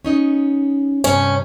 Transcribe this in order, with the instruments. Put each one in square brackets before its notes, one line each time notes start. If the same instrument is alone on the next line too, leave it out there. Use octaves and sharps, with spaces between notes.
[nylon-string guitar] C#4 D#4 D#5
[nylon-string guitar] G2 C3 [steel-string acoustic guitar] C#4